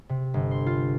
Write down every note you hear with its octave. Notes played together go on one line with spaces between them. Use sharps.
C3
G1
C6
F4